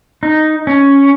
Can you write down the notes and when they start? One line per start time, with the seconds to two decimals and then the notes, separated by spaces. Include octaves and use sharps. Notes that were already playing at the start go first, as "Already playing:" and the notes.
0.23 D#4
0.67 C#4